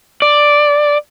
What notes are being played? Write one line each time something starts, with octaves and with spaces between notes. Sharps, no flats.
D5